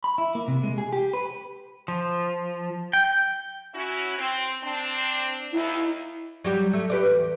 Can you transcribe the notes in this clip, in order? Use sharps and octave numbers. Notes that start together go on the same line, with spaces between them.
B5
E4
A#3
C3
G#3
G#4
G4
B4
F3
G5
C#4 E4 F#4
C4
C4 D4
D#2 E4
F#3 G3 G4
A3
G4 B4 D5
E2